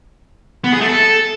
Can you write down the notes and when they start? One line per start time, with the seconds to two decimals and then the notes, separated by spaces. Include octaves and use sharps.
0.64 B3
0.72 G#4
0.81 A3
0.89 A4